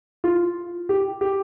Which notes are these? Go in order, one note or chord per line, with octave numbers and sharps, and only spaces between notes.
F4
G4
G4